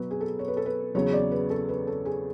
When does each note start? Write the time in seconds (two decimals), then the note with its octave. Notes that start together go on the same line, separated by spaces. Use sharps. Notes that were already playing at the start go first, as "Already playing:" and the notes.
Already playing: B2 F#3 B3 B4
0.11 G#4
0.20 A4
0.39 C#5
0.48 B4
0.57 A4
0.66 B4
0.95 E2 C#3 F#3 C#5
1.13 D5
1.31 B4
1.50 A4
1.69 B4
1.87 A4
2.05 G#4